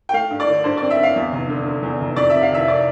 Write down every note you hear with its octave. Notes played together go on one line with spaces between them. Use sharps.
G5
A3 F5
G2
D5
D3
G2 C5
C4 D5
E5
G2
F5
E2
F1
D3
D3
E2
F1
F2 D5
C3 E5
F5
F1 E5
D5